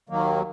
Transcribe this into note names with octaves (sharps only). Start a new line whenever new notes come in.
D#2 D#3 F#3 A#3